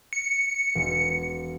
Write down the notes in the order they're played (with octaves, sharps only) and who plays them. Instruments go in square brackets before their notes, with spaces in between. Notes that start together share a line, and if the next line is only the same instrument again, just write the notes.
[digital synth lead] C#7
[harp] E1